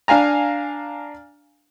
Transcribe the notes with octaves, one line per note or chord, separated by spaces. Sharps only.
D4 F5 G#5 A#5